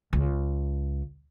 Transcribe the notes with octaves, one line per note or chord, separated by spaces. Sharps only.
C#2